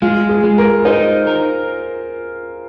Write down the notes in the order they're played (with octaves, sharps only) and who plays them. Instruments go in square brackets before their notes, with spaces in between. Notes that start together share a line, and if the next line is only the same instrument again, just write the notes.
[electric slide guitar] G#3 [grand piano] F4
[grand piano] G#4
[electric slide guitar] G#3
[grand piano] A#4
[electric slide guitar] D#4 [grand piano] C5
[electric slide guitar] A#4